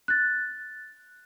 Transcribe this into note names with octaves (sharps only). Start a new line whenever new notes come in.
F#6 A6